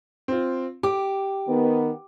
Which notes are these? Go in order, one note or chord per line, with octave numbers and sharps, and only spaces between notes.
C4 F4
G4 D6
D#3 B3